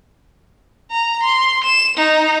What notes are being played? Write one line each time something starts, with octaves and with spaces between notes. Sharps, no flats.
A#5
C6
E7
D#4